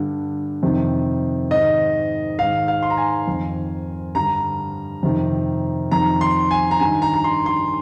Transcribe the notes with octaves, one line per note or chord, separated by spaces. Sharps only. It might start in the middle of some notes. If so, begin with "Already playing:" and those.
Already playing: G2 D3
F2 C3 D#3
G#2 D#3 D#5
G#2 D#3 F5
F5
C6
A#5
G#5
F2 D#3
G2 D3 A#5
F2 C3 D#3
F2 D#3 A#5
C6
G#5
A#5
G2 D#3 G#5
A#5
A#5
C6
C6